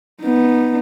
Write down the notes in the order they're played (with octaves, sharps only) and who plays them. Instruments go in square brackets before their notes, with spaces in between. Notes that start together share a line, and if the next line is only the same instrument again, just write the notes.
[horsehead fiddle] B3 D#4